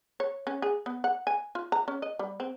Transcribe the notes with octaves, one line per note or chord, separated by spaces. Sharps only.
C#5
C#4
G#4
B3
F#5
G#5
F4
A#5
C#4
D#5
G3
C4